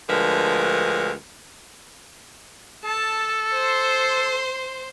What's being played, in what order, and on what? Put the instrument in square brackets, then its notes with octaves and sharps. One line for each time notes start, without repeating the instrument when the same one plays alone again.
[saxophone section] D2 D3 F3 G#3 A#4 B4
[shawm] A4 [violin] A5
[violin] C5 C6